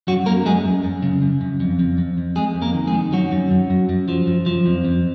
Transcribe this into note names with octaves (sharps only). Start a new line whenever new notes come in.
F#2 F#3 F#4
F#2 A#3 A#4
F#2 G#3 G#4
F#2
F#2
C#3
F#2
F#2
F2
F2
F2
F2
F2 G#3 G#4
F2
A#3 A#4
D#3
G#3 G#4
D#3
F#2 F#3 F#4
F#2
F#2
F#2
F#2
F3
F#2
F3
F2
F2